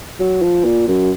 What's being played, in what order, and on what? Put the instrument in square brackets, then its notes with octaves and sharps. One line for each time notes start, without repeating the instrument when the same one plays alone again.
[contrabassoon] F#3
F3
A#2
F#2